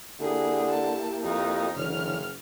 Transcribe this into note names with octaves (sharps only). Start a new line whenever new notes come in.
D3 A#3 E4 G4 G#4
A5
F2 D#4
F#1 D3 E3 C#4 F6